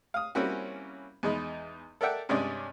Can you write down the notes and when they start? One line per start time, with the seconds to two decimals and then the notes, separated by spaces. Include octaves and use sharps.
0.14 F5 D#6
0.35 G3 A#3 C4 C#4 E4 F#4
1.23 E2 G#3 D#4 B5
2.01 A4 A#4 D5 E5 F#5 G5
2.29 G2 C3 G#3 C#4 G#4 D5